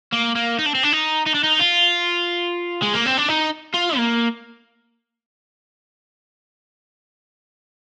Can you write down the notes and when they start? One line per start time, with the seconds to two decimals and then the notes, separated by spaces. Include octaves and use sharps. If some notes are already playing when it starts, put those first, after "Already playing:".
0.13 A#3
0.36 A#3
0.59 D#4
0.66 D4
0.75 C4
0.83 D4
0.92 D#4
1.26 D#4
1.34 D4
1.43 D#4
1.59 F4
2.82 G#3
2.94 A#3
3.06 C4
3.18 D4
3.29 D#4
3.74 F4
3.97 A#3